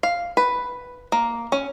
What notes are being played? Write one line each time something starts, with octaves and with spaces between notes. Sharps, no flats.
F5
B4
A#3
C#4